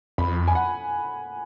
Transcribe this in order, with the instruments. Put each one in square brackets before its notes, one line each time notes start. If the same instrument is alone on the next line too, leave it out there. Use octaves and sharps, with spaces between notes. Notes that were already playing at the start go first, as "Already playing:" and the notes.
[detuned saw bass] F2 [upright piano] B5
[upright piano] G#5
F#5